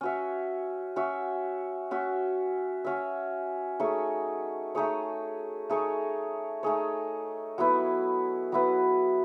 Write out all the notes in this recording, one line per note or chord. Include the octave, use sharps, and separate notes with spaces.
C#4 F#4 C#5 E5
C#4 F#4 C#5 E5
C#4 F#4 C#5 E5
C#4 F#4 C#5 E5
A3 D#4 G#4 C#5
A3 D#4 G#4 C#5
A3 D#4 G#4 C#5
A3 D#4 G#4 C#5
F#3 B3 E4 B4
F#3 B3 E4 B4